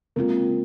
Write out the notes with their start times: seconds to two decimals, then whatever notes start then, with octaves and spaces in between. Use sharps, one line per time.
0.16 C#3 G#3 A#3 C4 F4